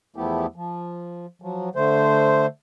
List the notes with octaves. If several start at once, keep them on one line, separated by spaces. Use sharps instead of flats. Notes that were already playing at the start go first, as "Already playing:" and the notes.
E2 F3 A3 B3 E4 G4
F3
F3 F#3
D3 A3 C5